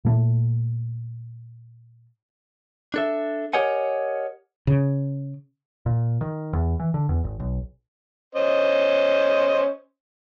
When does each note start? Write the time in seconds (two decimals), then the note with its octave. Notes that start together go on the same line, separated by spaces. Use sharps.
0.05 A#2 A3
2.94 D4 A4 E5
3.53 G4 A#4 C#5 D#5 F#5 G#5
4.67 C#3
5.86 A#2
6.21 D#3
6.53 E2
6.80 E3
6.94 D3
7.09 E2
7.24 G#1
7.40 B1
8.35 C#4 C5 D#5